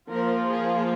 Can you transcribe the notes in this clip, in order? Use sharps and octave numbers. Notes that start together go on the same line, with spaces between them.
F3 A#3 F4 A#4
G#4